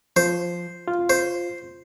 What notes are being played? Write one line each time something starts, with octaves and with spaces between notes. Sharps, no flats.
F3 C5
F4
C5